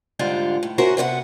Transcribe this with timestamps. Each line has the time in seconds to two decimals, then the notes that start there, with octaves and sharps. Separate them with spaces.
0.19 G#2 D3 G3 F4
0.63 A2
0.78 A3 C#4 F#4 A#4 C5
0.97 C3 B3 C#5 F#5